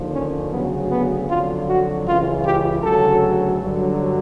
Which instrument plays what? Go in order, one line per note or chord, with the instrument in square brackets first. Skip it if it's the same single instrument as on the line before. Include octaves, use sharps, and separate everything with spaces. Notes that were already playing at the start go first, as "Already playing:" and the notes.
Already playing: [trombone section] D#2 D3 F3
C#4
D2 C#3 F#3 B3
B3
F2 D3 F#3 F4
F#4
C#2 C#3 E3 F4
G4
D2 C#3 F#3 A4
G2 D3 F#3